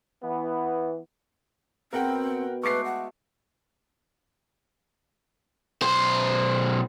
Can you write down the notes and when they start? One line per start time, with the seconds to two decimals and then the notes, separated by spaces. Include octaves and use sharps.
0.22 E3 B3
1.93 B2 C4 A#4 F#5 G5
2.63 G#3 A3 B4 C#6 D6 C7
2.85 F#5
5.82 B1 C5